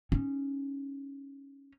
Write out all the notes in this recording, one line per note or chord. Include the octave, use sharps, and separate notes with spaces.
C#4 D#4